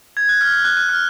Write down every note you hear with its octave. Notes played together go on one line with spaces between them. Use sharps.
G#6
F#6
F6
F6
F#6
F#6
F6